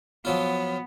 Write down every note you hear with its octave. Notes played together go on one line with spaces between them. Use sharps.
F3 F#3 B3 F4